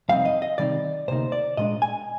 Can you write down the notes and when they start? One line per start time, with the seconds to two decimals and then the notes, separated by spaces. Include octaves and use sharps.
0.09 F2 C3 G3 C4 D#4 F5
0.25 D#5
0.42 D#5
0.58 C3 D#3 G3 C4 D#4 D5
1.08 D2 C3 A#3 D#4 C5
1.32 D5
1.57 A#2 G#3 D4 D#5
1.82 G#5